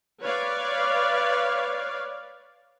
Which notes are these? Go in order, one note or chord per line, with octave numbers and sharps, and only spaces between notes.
B4 C#5 D5 F5